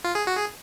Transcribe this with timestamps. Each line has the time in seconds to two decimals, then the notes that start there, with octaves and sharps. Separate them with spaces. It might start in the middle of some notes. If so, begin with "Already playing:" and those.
0.04 F4
0.15 G#4
0.27 F#4
0.37 G#4